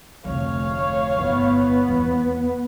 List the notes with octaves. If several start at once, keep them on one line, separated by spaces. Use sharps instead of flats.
F1 D2 C#5 F5
G1 B3 E4
E2 D#3